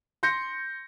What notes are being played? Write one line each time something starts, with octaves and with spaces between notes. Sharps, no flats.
C6 G6 A#6 C#7